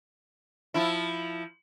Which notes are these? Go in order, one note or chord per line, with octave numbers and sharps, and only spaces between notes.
F3 E4